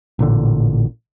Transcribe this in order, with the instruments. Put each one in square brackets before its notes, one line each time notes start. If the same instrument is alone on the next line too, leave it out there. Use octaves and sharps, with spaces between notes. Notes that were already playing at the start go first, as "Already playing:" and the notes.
[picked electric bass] A1 A#2 D3